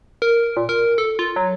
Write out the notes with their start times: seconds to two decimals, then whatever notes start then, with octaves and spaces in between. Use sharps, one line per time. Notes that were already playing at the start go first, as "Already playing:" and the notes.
0.22 A#4
0.57 A#2
0.69 A#4
0.98 A4
1.19 F4
1.36 F#3